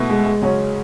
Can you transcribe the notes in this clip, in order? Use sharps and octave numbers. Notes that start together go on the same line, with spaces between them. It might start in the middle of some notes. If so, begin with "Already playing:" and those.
Already playing: B2 A3 E4 B4
G#3
G#3
C#3 F#3 C#4